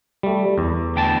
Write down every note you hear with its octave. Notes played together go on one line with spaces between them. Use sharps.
G3 A3
E2
D2 G5 A5